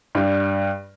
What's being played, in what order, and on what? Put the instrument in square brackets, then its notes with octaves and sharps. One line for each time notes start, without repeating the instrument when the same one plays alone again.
[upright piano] G2 G3